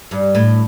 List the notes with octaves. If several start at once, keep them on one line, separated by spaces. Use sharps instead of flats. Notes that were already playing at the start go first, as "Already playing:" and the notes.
G2
A2